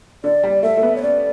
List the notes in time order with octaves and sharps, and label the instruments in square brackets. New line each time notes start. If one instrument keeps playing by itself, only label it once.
[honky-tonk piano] D3 [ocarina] D5
[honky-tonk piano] G3
[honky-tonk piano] A3 [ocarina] E5
[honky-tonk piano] A3
B3
[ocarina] C#5
[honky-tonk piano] C#4 [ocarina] D5